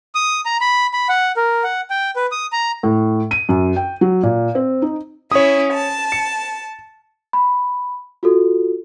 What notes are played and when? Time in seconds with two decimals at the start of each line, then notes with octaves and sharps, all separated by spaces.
0.15 D#6
0.45 A#5
0.61 B5
0.93 B5
1.09 F#5
1.37 A#4
1.64 F#5
1.90 G5
2.16 B4
2.32 D#6
2.52 A#5
2.83 A2
3.31 D#7
3.49 F#2
3.76 G5
4.01 F#3
4.23 A#2
4.55 C4
4.82 D#4
5.32 C#4 E4 C#5 D#6
5.73 A5
6.12 C#7
7.33 B5
8.23 F4 F#4 A4